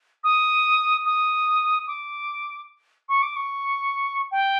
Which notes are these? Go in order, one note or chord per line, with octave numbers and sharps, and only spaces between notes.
D#6
D#6
D6
C#6
D6
C#6
G5